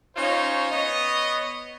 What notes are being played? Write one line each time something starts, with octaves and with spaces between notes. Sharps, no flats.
C#4 D#4 F4 C5 C#5
B3 C#5 D#5